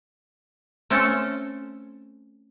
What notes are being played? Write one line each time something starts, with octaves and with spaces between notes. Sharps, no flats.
A3 C4 C#4 A4